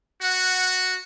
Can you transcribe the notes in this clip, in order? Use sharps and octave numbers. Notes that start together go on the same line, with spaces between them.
F#4 F#5